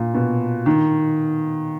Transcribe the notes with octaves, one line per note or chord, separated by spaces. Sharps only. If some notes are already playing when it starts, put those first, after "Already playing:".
Already playing: A#2
B2
D#3